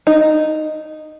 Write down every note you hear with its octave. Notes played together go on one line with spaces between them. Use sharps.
D#4